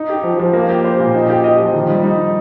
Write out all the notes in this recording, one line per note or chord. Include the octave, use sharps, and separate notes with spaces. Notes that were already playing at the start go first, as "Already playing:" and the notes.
Already playing: D#4
G4
F3
F3
A#3
G4
C5
A#2
D#4
G4
D#5
F3
D#3
G3
D#4